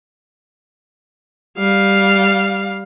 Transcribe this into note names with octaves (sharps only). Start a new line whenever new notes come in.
G3 F5